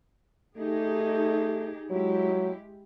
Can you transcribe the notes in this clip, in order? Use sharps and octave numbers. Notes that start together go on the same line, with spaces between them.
A3 D#4 G4 G#4
F#3 G#3 E4 G4